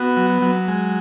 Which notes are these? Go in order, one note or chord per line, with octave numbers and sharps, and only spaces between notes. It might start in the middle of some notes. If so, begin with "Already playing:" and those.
Already playing: B3 F#4
F#3
F#3
G#3